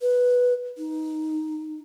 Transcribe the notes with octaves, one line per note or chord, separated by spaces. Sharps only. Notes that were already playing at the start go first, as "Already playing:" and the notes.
B4
D#4